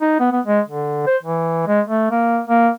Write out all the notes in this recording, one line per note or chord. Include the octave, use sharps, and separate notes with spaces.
D#4
B3
B3
G#3
D3
C5
E3
G#3
A3
A#3
A#3